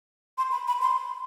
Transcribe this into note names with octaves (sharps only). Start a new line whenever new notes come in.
C6
B5
B5
C6